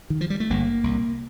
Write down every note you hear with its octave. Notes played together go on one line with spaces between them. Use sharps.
D#3
F3
G3
A3
G1 G2 D3 A#3
C2 A#2